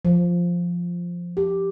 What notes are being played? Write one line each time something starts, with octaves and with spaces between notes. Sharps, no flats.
F3
G4